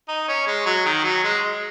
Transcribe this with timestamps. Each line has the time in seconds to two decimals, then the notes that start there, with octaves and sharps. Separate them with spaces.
0.08 D#4
0.28 C#4
0.47 G#3
0.66 F#3
0.85 D#3
1.04 F#3
1.24 G#3